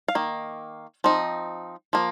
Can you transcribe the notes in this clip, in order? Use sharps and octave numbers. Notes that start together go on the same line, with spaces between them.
F5
D#3 A#3
F3 C4 D#4
F3 A#3